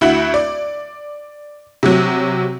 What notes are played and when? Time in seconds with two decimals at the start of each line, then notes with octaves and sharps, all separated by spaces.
0.01 D2 E4 F#4 F#7
0.34 D5
1.83 C3 F#3